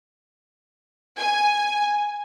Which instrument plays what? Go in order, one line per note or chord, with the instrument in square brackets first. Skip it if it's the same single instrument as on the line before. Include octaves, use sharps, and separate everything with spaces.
[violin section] G#5